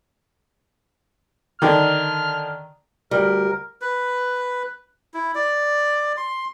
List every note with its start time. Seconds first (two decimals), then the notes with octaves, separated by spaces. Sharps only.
1.62 D3 D#3 F6
3.11 D2 G3 A#4
3.82 B4
5.14 E4
5.35 D5
6.17 C6